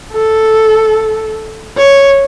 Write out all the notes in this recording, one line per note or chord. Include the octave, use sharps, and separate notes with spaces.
A4
C#5